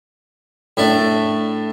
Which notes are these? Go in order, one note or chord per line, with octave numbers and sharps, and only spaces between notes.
A2 A3 D4